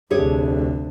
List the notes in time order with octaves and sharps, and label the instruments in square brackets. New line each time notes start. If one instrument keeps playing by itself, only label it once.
[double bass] F1 D2 [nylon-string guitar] G4 G#4 C#5